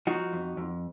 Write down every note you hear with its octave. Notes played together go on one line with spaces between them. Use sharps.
F3 D#4 F#4
F2
F2